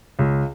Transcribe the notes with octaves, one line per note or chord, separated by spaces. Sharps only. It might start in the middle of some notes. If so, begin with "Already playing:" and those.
C#2